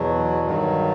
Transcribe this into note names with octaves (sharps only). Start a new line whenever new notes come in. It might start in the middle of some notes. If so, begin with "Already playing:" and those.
Already playing: E2 B2 F#3
G2 D#3 F#3